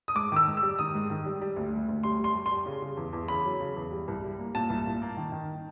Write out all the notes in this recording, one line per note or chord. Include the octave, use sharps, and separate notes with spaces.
D#6
G#2 D6
D#3 E6
G#2
E6
G3
D#3 D#6
G#2
D#3
G3
G3
D2
G3
D2
G3 C6
G3
C6
G3
C6
G3
C#3
C#3
E2
E2
C#3 B5
F#3
C#3
E2
G3
C2
G3
A#3
A#2 A5
C2
A#2
A#3
D#3
D#3